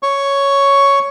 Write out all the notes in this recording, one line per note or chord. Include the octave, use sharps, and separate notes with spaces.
C#5 C#6